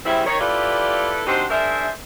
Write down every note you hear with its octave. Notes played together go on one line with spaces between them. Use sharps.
C#3 G3 C4 E4
D#3 C#5
E4 F4 G4 A4 B4 D5
C4 D4 D#4 F#4 G4 C5
D4 G#4 A#4 C5 E5